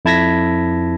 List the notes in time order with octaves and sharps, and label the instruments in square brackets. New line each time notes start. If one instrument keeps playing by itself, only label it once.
[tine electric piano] F2 E4 A5 G#6 A#6 B6